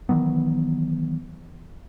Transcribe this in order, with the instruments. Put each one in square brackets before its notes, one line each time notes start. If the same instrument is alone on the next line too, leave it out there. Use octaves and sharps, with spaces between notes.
[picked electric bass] D#3 E3 F#3 B3